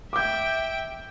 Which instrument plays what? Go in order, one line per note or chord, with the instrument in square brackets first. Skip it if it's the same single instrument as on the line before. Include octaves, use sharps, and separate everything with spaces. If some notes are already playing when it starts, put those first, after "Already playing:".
[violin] E5 G5 [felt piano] D6 G6